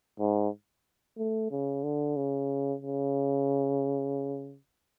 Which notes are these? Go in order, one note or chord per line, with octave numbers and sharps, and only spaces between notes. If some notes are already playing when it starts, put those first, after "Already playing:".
G#2
A3
C#3
D3
C#3
C#3